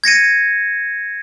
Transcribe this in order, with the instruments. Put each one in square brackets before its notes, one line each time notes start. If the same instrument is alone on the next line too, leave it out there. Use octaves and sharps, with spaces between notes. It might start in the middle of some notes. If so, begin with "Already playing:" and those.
[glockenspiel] G#6 A#6 C#7 D#7